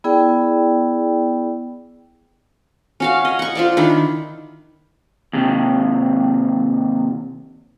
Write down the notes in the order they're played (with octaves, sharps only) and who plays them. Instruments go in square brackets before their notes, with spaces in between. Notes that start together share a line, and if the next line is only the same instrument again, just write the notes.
[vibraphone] B3 E4 G#4 D5 G5
[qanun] C#4 F#4 F5
D#5
F#5 C#6
F4 C5 D5
D#3 D4 E4
[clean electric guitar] D#2 C3